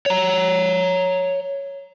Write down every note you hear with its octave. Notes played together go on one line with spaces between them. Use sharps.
C#5 A#5